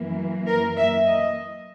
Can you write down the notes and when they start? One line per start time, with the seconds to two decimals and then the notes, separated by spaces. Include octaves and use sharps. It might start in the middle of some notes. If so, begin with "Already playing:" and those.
Already playing: F#2 E3 A#3
0.49 A#4
0.77 E5
1.06 D#5